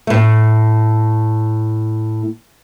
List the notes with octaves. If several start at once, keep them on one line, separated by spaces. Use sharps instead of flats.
A2 A3